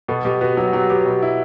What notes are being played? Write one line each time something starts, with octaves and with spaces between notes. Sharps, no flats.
B2 A4
B2 G4
B3 F#4
F#3 G4
F#3 G4
B3 G4
B2
E4